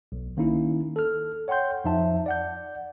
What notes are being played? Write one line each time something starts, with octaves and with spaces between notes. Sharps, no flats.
B1
D#3 A#3 C#4 D#4 E4
A4 F6
C#5 F#5 G5 C6 G6
F2 F3 D#4 E5 A5
D5 F#5 G6